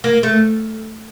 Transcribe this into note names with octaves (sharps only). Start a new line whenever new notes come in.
A#3
A3